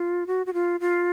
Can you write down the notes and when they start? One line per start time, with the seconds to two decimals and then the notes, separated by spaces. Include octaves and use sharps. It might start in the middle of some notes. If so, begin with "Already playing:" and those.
Already playing: F4
0.27 F#4
0.46 F#4
0.54 F4
0.80 F4